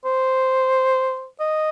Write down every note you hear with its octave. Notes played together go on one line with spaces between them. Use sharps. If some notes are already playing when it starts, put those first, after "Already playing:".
C5
D#5